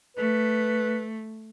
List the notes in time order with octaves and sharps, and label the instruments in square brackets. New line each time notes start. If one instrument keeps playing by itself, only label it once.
[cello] A3 [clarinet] B4